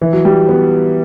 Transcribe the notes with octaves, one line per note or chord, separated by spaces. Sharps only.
E3
F#3
G3
B3